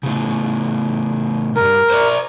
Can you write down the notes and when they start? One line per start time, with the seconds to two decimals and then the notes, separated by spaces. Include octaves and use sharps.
0.03 A2 C#3
1.56 C2 G2 A#4
1.90 C5 D5